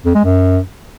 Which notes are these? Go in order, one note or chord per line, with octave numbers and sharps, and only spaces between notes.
F2
G#3
F#2